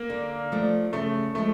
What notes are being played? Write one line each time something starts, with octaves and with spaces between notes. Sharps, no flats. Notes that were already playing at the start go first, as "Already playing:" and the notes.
Already playing: A#3
D3
F3 A3 D4
C#3 A3
F3 G#3 A3